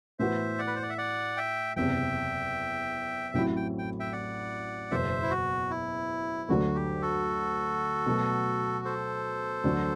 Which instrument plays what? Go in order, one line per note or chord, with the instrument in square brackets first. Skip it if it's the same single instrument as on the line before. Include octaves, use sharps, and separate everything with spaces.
[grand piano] A2 E3 B3 F#4 [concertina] C5 E5
[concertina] D5 F#5
B4
C5
D5
E5
D5 F#5
E5 G5
[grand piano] F#1 E2 C3 [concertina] E5 G5
[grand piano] A1 A2 F#3 C4 E4 [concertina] G5
[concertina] G5
G5
E5 G5
D5 F#5
[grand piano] F#1 E2 B2 [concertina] C5 E5
[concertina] E4
F#4
E4
[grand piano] D2 D3 F#3 A3 [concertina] F#4
[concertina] G4
F#4 A4
[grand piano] B2 F#3 A3
[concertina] A4 C5
[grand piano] D2 D3 F#3